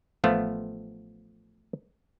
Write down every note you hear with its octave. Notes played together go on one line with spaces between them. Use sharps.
A1 F3 A3 B3 F4 F5